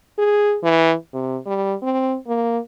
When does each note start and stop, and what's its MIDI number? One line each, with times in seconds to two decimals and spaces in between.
0.19 0.58 68
0.63 0.94 52
1.13 1.38 48
1.46 1.74 55
1.83 2.16 60
2.27 2.59 58